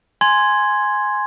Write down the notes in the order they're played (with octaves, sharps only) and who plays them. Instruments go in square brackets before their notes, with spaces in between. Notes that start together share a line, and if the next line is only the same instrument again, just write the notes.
[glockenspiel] G#5 C6 G#6